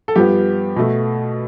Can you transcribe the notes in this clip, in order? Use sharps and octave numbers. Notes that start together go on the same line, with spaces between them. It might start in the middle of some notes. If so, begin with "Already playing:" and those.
A4
G2 F3 B3 G4
B2 A3